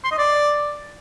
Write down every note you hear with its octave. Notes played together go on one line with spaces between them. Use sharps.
C6
D#5
D5